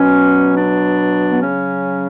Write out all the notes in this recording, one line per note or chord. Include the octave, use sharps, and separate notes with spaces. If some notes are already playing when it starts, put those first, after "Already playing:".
Already playing: B2 F#3 C#4
D4
B3
C#3 F#3 C#4